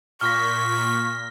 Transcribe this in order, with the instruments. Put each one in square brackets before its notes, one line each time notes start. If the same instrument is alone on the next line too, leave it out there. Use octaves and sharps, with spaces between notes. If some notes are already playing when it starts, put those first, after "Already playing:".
[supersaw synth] A#2 B6 [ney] C#6 [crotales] F6 A#6